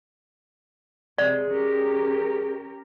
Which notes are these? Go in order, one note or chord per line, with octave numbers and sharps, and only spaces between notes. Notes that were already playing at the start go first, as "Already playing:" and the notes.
C3 G#3 G#4 D5
C#4 G4 A#4